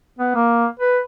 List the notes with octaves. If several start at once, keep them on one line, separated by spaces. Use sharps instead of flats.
B3
A#3
B4